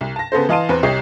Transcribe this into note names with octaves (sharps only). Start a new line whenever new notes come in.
C2
A5 A#6
C#3 B3 A4 C5
E3 D#5 F5 A5 C6 D#7
E2 C4 B4
C2 G4 C#5 D#5 C7